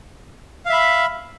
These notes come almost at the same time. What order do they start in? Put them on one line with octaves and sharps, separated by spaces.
F5 E5 B5